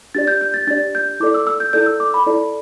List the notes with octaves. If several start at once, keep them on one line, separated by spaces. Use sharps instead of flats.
D4 G4 D5 A6
G6
G6
A6
D4 G4 D5 A6
G6
E4 A4 D5 D6
E6
E6
G6
E4 A4 D5 G6
E6
D6
B5
E4 A4 D5